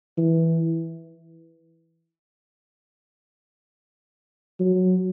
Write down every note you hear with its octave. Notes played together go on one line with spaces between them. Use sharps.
E3
F#3